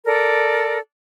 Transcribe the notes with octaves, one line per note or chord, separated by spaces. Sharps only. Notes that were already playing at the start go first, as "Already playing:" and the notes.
A4 A#4 D5